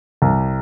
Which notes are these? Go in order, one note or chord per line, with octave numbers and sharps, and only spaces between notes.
C2